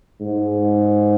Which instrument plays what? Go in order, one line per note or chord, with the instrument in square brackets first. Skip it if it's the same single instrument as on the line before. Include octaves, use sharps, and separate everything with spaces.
[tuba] G#2